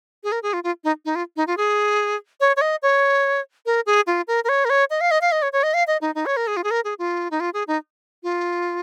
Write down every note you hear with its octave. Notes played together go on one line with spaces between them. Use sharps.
G#4
A#4
G#4
F4
F4
D#4
D#4
F4
D#4
F4
G#4
C#5
C#5
D#5
C#5
A#4
G#4
F4
A#4
A#4
C#5
A#4
C#5
D#5
F5
D#5
F5
D#5
C#5
C#5
D#5
F5
D#5
D#4
D#4
C#5
A#4
G#4
F4
G#4
A#4
G#4
F4
D#4
F4
G#4
D#4
F4